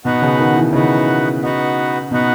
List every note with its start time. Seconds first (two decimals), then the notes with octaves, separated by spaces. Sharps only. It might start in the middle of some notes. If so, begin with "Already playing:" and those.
0.05 B2 B3 D#4 F#4 B4 F#5
0.22 C#3
0.39 D#3
0.56 E3
0.73 C#3 B3 D#4 F#4 B4 F#5
1.42 B3 D#4 F#4 B4 F#5
2.11 B2 B3 D#4 F#4 B4 F#5